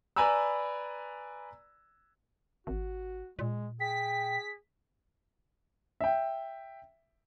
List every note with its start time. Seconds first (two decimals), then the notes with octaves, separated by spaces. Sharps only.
0.16 B4 D5 G#5 A#5 B5 E6
2.67 G#1 F#4
3.39 A#2 G#3
3.80 G#4 G5 B6
6.01 E5 G5